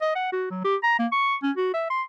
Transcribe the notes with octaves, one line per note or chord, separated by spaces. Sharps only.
D#5
F#5
F#4
F#3
G4
A#5
A#3
C#6
C#4
F#4
E5
C6